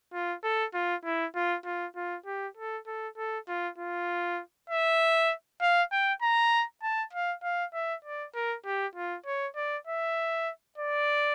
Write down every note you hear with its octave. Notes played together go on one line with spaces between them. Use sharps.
F4
A4
F4
E4
F4
F4
F4
G4
A4
A4
A4
F4
F4
E5
F5
G5
A#5
A5
F5
F5
E5
D5
A#4
G4
F4
C#5
D5
E5
D5